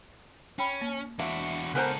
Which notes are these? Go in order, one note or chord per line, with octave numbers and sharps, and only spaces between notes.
C#4 G5 B5
A#3
E2 D4 F#4 E5
C#2 B3 A4 A#4 C5 G#5 A#5